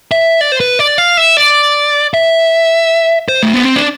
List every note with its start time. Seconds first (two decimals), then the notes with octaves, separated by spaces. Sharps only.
0.12 E5
0.41 D5
0.52 C5
0.60 B4
0.79 D5
0.98 F5
1.17 E5
1.37 D5
2.14 E5
3.28 C5
3.43 A3
3.54 B3
3.65 C4
3.76 D4